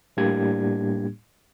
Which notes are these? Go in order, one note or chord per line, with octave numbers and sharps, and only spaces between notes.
A2 G3 A#3 D4 G4 G#6